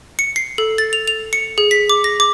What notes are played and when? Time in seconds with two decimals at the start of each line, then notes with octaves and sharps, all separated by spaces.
0.19 C#7
0.36 C7
0.58 A4
0.78 A6
0.93 F7
1.08 F7
1.33 C#7
1.58 G#4
1.71 B6
1.89 D6
2.04 A#6
2.20 D6